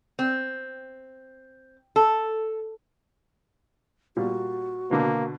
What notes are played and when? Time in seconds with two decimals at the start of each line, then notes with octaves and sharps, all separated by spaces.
0.19 C4
1.96 A4
4.16 A#2 G3 F#4
4.91 B2 D3 A#3